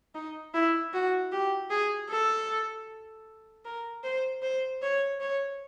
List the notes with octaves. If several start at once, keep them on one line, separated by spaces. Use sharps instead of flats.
D#4
E4
F#4
G4
G#4
A4
A#4
C5
C5
C#5
C#5